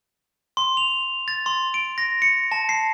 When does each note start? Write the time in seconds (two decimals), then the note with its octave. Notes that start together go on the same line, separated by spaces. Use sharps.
0.57 C6
0.77 F7
1.28 A6
1.46 C6
1.74 D7
1.98 A#6
2.22 C#7
2.52 A5
2.69 C7